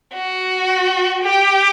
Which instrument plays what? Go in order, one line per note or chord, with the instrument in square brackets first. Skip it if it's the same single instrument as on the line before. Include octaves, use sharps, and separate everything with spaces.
[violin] F#4
G4